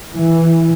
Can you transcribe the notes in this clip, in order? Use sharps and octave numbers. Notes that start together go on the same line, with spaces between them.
E3